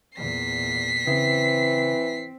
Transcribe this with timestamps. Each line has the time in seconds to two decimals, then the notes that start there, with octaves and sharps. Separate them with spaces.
0.16 E2 A#2 B6 C7
1.07 C#3 E3 C4